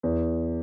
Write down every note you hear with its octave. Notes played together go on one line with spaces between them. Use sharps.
E2